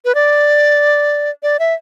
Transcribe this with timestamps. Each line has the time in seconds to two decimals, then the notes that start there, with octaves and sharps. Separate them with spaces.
0.05 B4
0.15 D5
1.43 D5
1.59 E5